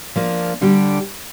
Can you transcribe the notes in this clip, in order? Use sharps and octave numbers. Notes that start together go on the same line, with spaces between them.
F3 A#3 D4
D3 G3 D4 G4